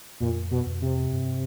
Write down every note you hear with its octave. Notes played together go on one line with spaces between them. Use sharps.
F2 A#2
B2
F2
C3
G2